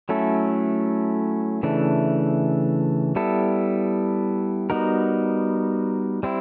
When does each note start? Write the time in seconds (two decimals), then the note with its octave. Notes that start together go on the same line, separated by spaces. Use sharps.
0.09 F#3 A3 C#4 E4 A4
1.63 C#3 E3 A3 D4
3.16 G3 B3 E4 A4
4.70 G3 B3 D#4 F#4 A#4
6.23 G3 C4 E4